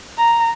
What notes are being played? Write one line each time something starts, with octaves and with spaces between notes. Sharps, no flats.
A#5